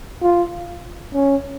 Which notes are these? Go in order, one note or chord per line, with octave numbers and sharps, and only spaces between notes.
F4
C#4